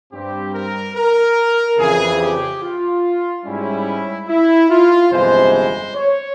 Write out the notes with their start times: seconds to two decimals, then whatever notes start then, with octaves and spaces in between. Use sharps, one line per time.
0.12 G2 G3 C4 G4
0.54 A#4
0.96 A#4
1.78 F2 C#3 E3 G#4
2.20 G4
2.62 F4
3.45 G#2 G3 C#4 E4
4.28 E4
4.70 F4
5.11 G1 F2 C3 E3 G#3 C5
5.53 C5
5.95 C#5